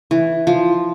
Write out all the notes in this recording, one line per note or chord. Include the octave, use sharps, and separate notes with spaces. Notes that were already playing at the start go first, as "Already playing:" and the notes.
E3
F3